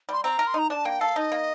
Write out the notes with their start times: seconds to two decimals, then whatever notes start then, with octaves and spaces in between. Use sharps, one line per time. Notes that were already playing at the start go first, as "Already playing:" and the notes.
0.09 G3 C6
0.24 C4 A#5
0.39 A#4
0.47 C6
0.54 D#4 A#5
0.70 D4 A5
0.85 A#3 G5
1.00 A4 F5
1.16 D#4 D#5
1.32 A#3